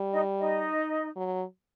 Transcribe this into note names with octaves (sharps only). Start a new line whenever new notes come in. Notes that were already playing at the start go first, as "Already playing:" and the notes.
Already playing: G3
D#4 D#5
D#4 D#5
F#3